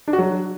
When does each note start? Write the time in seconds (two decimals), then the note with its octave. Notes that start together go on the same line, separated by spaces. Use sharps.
0.08 D4
0.13 F#4
0.19 F#3